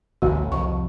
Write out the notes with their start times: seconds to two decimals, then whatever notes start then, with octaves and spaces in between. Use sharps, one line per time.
0.22 A1 D2 G3 F#4
0.52 C2 F2 C#6